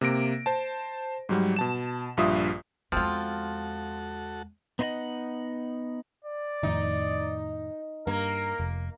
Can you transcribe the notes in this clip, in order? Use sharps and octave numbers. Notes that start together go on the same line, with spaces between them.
C3 A#3 A#6 D7
C5 A5
G#2 F#3 G3
B2 A5 E7
A#1 G2 F4 E5 D#6
E2 F3 G#3 C4 F4 F#4 A4
B3 D#4 F4 C5 D#5 F#5
D5
F2 A2 D#3 D#4
G2 A#3 A#4
F1